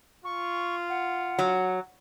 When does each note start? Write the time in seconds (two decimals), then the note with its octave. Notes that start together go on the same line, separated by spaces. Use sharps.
0.24 F4 C#6
0.90 F#5
1.39 F#3